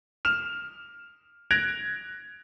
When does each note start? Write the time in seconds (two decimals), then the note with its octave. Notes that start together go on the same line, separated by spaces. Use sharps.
0.25 F6 E7 F7
1.51 F#6 G#6 A#6 D7 F7